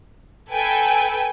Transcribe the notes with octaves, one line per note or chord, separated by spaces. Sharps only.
A4 B4 G5 G#5